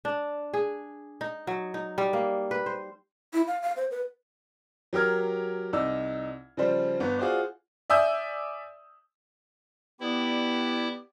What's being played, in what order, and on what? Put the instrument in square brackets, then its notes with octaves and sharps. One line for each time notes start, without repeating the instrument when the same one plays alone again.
[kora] D4
G#4
D#4
F#3
D#4
G3
A#3
B4
C5
[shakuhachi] E4
F5
F5
C5
B4
[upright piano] F#3 G4 A#4 F6 G#6
C2 D#4 D5 E6
C#3 F3 G3 C5
G1 B3
F4 F#4 G#4 C5 D5
[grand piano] D5 E5 G#5 D#6 E6 G6
[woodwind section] B3 [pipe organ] E4 [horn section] G4 D5